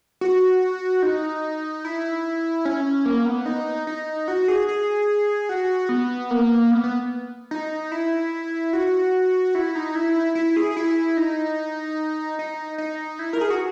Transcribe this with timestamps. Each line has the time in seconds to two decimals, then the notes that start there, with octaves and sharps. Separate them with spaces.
0.21 F#4
1.03 D#4
1.85 E4
2.65 C#4
3.05 A#3
3.26 B3
3.46 D#4
3.87 D#4
4.28 F#4
4.48 G#4
4.68 G#4
5.49 F#4
5.89 B3
6.31 A#3
6.71 B3
6.84 B3
7.51 D#4
7.92 E4
8.73 F#4
9.55 E4
9.75 D#4
9.95 E4
10.35 E4
10.56 G#4
10.77 E4
11.17 D#4
12.39 D#4
12.78 D#4
13.19 E4
13.33 A#4
13.41 G#4
13.50 F#4